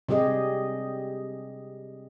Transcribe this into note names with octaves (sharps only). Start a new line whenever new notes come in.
C3 G3 G4 G#4 D#5